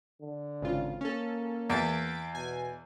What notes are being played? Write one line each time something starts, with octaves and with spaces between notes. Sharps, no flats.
D3
G#1 C#3 F4
A#3 C#4 A4
E2 A6 B6 D7
B2 G#5